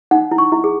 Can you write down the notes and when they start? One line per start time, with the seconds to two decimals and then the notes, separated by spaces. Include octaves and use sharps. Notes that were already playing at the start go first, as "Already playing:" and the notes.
0.11 D#4 F#5
0.31 E4
0.38 C#6
0.52 E4
0.64 G#4